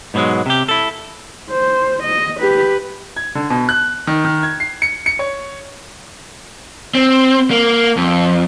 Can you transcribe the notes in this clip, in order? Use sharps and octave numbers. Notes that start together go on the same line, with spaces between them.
G#2 B2 D3 F#3 G#3
C3 G4
E4 A4
C5
D#5
G4 B4
G#6
D3
B2
F#6
D#3
D#3
G#6
C7
C#7
C#7
C#5
C4
A#3
F2